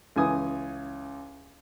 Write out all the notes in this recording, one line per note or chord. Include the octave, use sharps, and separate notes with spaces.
C#2 E3 G#5 D#6